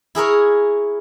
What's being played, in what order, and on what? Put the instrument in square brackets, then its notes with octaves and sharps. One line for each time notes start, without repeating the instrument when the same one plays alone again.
[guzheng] E4 G#4 A#4 C#5